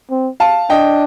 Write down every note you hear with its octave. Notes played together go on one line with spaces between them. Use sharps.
C4
F5 A5
D4 D#5 G5